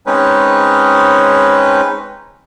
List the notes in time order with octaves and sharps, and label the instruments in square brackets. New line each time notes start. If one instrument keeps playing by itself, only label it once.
[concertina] G#3 C4 C#4 D#4 B4 C#5